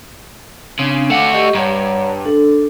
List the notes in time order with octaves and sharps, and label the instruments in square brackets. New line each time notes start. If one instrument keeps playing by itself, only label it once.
[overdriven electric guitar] C#3 [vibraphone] C4 D4
[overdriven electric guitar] A3 F#4 [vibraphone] F5 D6
[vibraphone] G4 D#5 C#6
[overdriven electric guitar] G2 [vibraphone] C#5 F#5 A#5
[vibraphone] D4 A4